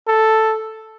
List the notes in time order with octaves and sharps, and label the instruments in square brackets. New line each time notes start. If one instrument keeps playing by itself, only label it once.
[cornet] A4